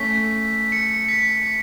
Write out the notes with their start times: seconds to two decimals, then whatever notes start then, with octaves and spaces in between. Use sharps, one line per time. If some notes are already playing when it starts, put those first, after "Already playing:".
Already playing: A3 C#4 B6
0.72 C#7
1.09 B6